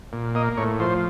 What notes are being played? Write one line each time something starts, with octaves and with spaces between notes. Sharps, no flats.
A#2
A#3 D#5
A2 C#5
F3 C5